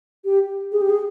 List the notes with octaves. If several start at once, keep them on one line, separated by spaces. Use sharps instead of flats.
G4
G#4
G4
G#4